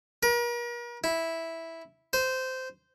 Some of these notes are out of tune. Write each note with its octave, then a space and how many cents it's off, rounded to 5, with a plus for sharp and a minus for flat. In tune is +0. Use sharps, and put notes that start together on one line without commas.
A#4 +40
E4 -5
C5 -15